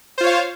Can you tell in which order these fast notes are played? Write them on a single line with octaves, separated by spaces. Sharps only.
C5 F4 C#5 F5